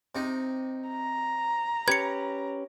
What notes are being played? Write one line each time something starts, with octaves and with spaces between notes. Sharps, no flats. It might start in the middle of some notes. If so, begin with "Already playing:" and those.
C3 D#4
A#5
C#4 G4 B4 G#6 C#7